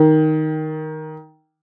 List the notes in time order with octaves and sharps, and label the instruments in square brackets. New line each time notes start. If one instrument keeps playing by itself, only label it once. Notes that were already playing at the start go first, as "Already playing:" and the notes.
Already playing: [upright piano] D#3